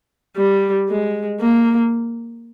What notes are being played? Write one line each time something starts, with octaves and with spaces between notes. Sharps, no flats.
G3
G#3
A#3